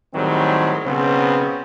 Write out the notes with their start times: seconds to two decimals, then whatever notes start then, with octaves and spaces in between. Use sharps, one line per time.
0.15 A2 D#3 F#3 G3 C4 G#4
0.85 B1 C#3 B3 C4 C5